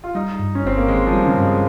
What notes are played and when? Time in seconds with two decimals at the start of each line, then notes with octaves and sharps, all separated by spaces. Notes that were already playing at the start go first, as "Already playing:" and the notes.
0.04 F4
0.15 G3 D#4
0.39 G2
0.55 C#4
0.64 G1 C4
0.77 A#3
0.88 D#3 G#3
1.07 F3
1.13 G3
1.26 C#3
1.37 G2
1.44 G#3